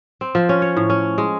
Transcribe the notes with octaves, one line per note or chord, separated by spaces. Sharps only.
C4
F3
C#4
C#5
A2
C#4
G#3